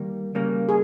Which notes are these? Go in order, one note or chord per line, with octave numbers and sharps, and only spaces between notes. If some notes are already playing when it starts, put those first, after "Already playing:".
Already playing: D#3 G3 A#3
C#3 G3 A#3
G#4